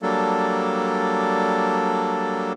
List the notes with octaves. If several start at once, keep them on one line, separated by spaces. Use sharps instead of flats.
F#3 G3 A#3 D4 A4